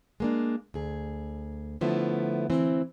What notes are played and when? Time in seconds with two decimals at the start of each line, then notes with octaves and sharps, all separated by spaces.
0.20 G#3 A#3 D4
0.74 D2 G#4
1.81 D3 F3 A3 B3 E4
2.50 E3 C4